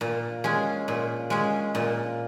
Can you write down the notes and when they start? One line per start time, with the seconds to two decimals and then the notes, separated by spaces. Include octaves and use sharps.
0.01 A#2
0.44 G#3 C#4 G#4
0.88 A#2
1.30 G#3 C#4 G#4
1.75 A#2